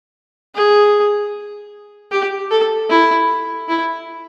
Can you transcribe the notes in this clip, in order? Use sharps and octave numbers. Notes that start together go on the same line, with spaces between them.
G#4
G4
A4
E4
E4